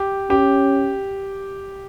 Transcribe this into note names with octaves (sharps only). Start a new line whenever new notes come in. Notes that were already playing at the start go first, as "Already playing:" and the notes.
Already playing: G4
C#4 G4